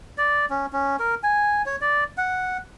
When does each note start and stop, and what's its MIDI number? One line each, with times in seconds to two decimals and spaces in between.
0.18 0.46 74
0.50 0.66 61
0.73 0.96 61
0.99 1.15 70
1.23 1.62 80
1.66 1.76 73
1.81 2.04 74
2.18 2.57 78